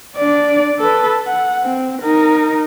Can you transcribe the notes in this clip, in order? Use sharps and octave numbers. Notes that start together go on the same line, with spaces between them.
D4 D5
A4 B4
F#5
C4
D#4 A#4